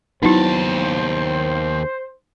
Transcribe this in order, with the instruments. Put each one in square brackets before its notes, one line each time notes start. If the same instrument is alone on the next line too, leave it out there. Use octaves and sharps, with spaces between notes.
[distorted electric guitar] D#2 A5 [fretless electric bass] F#3 B3 [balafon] D#4 E4 [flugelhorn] C5